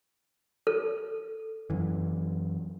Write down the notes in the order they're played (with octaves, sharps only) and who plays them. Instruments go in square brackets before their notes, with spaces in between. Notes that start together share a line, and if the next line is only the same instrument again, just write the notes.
[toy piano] A4
[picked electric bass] F#2 E3